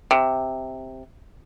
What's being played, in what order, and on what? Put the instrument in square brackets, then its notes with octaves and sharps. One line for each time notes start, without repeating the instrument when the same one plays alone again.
[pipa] C3